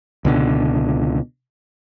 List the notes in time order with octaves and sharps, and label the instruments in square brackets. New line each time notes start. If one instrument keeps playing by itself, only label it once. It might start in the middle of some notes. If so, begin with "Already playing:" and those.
[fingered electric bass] C#2 B2 D3